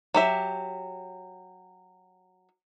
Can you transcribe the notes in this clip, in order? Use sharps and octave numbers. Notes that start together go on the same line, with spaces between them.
F#3 G4 E5